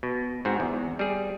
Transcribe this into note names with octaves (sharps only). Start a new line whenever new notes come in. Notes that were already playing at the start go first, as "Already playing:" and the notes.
B2
G#2 C4 F#4
E2
G3 G#4